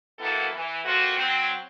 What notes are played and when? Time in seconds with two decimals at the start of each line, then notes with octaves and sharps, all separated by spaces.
0.19 D#3 F#3 A#3 B3 E4 A4
0.53 E3
0.85 A3 A#3 C4 F4 F#4
1.16 F#3 C4